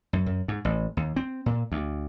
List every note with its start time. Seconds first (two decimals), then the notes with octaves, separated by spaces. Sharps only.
0.13 F#2
0.26 F#2
0.48 G#2
0.65 A1
0.97 D#2
1.16 C4
1.46 A#2
1.72 D2